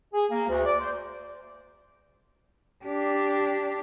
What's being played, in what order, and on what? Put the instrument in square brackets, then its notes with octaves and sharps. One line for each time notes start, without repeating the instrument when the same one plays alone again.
[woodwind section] G#4
A#3
D2
D5
C5
[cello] D4 G4